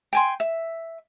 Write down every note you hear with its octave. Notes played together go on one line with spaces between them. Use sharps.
G5 G#5 C6
E5